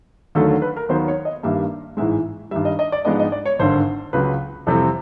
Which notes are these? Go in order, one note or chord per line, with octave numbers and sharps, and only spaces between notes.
D#2 D3 F#3 A3 A4
A4
B4
A#4
D#2 D#3 F#3 B3 C5
C#5
D#5
G2 D#3 G3 A#3 E5
A1 G#2 E3 G#3 E5
G2 D#3 G3 E5
D#5
D#5
D5
G#2 F3 G#3 B3 D4 D#5
D#5
D5
C#5
G#1 G2 D3 C5
C#2 C#3 F#3 B4
F2 C3 E3 G3 C4 A4